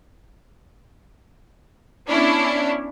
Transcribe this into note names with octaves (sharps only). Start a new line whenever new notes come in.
B3 C#4 D4 E4